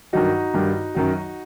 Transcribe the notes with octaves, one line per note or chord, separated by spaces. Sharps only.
G2 D#3 F#3 D#4 F#4
G2 D#3 G3
F#2 D#3 F#3